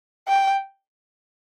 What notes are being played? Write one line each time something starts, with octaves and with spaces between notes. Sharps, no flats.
G5